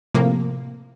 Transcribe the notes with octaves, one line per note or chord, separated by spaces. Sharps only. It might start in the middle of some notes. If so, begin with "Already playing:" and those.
A2 C3 F3 A#3